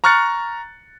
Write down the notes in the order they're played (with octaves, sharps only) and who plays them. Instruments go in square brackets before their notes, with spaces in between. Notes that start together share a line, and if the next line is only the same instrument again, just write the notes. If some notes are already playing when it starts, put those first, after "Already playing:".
[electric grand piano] A#5 C#6 F6 F#6 A6 C#7